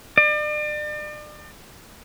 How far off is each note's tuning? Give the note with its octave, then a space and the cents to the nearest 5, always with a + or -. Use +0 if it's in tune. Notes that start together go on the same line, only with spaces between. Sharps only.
D5 +40